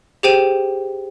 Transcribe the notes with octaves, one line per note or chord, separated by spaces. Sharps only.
G4 G#4 C5 G5 D#7 E7